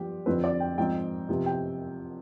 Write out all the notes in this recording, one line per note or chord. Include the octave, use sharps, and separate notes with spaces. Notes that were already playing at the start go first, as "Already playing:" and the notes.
Already playing: G2 F3 B3 G4
F2 D3 F3 C4 B4
D5
G5
G#2 F3 C4 G5
C3 F3 B3
G5